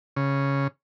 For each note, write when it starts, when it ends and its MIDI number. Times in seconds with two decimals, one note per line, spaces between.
0.16 0.67 49